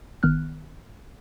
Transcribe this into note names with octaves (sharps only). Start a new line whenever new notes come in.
G1 D#3 B3 F6 F#6